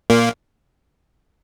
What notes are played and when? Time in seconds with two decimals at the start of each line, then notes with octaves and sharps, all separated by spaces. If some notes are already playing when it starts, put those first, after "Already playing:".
0.10 A#2 A#3